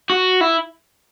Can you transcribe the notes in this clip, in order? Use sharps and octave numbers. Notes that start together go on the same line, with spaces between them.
F#4
E4